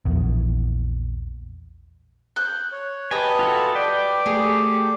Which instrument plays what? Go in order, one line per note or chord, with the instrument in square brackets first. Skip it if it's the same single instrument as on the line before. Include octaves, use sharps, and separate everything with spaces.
[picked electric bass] A#1 E2
[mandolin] F#6 G6
[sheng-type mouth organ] C#5
[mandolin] G4 D#5 [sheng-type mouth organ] B4 A5 [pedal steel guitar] G#5
[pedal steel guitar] F4 F#4 A4
[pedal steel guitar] B4 G5 [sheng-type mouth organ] D5
[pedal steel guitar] A3 G4 [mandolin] G#4